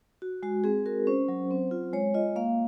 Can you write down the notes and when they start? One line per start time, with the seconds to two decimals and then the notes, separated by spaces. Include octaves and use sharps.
0.22 F#4
0.43 G#3 F#4
0.64 C4 G#4
0.86 F#4 A#4
1.07 C#4 C5
1.28 F#3
1.51 C4
1.71 F4
1.93 G#3 C#5
2.14 F4 D#5
2.36 A#3 F5